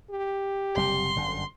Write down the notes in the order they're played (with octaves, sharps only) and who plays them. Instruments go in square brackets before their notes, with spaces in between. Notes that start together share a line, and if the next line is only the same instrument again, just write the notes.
[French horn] G4
[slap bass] F#1 C3 G3 [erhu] C6
[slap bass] G1 F#2 D3